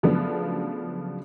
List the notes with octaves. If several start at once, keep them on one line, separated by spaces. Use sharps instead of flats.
C#3 F3 F#3 A3 B3 D4